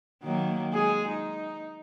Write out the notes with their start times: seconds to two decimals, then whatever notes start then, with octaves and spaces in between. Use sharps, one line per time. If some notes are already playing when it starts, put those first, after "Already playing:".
0.23 D#3 F#3 A#3
0.73 G#3 G#4
1.08 D#4